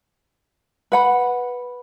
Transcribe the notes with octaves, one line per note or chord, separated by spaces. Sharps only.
B4 F#5 B5